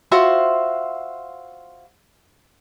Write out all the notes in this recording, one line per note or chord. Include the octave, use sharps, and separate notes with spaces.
F4 F#4 C5 E5